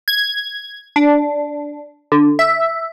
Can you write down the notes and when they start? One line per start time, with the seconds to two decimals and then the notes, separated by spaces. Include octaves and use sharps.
0.08 G#6
0.96 D4
2.12 D3
2.39 E5